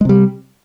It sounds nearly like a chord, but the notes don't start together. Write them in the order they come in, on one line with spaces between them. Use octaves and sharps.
G#3 C3 G3